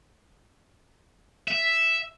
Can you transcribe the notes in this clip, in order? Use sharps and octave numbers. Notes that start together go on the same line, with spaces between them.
E5